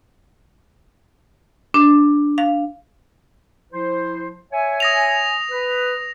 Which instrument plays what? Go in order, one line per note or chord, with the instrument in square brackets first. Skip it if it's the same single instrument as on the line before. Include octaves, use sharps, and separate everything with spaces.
[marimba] D4
F5
[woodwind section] F3 E4 C5
C#5 E5 G#5
[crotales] D#6 A#6 F7
[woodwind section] B4